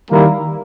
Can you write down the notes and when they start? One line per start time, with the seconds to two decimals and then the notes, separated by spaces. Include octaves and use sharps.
0.11 D#3 G3 A#3 E4 A#4